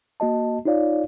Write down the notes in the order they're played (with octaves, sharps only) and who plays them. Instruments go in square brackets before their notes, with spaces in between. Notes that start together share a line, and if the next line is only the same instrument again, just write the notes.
[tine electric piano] A#3 F#4 D#5 A5
D#4 F4 C#5 D5 F5